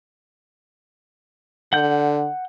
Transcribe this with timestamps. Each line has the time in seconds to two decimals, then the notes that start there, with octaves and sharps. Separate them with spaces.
1.73 D3 F#5 G6